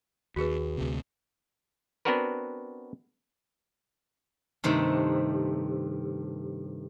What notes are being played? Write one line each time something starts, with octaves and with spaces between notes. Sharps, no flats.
D#2 F#4 G#4 B4
D2 C3
B3 C4 D4 F#4 A#4 B4
G2 C3 D#3 A3